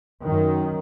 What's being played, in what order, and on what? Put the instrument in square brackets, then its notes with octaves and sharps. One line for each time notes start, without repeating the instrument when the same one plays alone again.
[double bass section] F#2 D#3